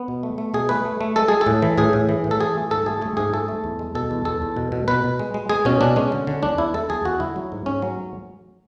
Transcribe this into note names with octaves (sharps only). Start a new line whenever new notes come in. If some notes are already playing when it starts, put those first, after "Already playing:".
Already playing: B3
B2
A3
A3
B2 G#4
A3 B4
A3
A3
G#3 A4
G#3 G#4
A4
A2
E3
A2 G#4
A2
E3
A2
A4
E3 G#4
A3
G#2 A4
A3 G#4
A3 G#4
G#2 G#4
A3 A4
A3
E2
G#3
B2 A4
E2
E2 A4
E2
B2
B2
B2 B4
B2
G#3
G#3
G#3 G#4
B2 C#4
B2 D4
G#3 C#4
D3
D3
E2 D4
E2 E4
G#3 A4
E2 G#4
E2 F#4
D3 E4
F#3
G#2
G#2 C#4
F#3